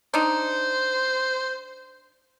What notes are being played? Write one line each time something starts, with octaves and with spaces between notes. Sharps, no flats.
D4 D#4 C5